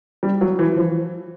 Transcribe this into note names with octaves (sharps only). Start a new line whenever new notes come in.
G3
F#3
E3
F3